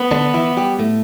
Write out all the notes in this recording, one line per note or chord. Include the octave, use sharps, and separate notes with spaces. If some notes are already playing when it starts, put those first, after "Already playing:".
Already playing: B3
D3 D4
E3 E4
G3 G4
A2 A3